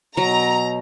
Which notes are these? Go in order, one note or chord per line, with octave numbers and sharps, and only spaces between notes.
B2 F#3 A#5